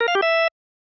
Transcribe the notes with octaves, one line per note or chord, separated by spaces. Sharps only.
A#4
F5
G4
E5